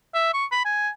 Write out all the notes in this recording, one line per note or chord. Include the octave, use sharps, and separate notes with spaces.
E5
C#6
B5
G#5